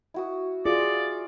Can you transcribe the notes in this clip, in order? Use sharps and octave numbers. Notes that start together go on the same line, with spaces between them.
E4 F#4 D#6
F4 G#4 D5